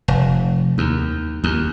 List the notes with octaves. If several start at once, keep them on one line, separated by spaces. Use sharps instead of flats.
F1
D#2
D#2